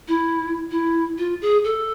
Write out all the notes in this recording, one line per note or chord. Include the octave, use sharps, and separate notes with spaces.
E4
E4
F4
G#4
A4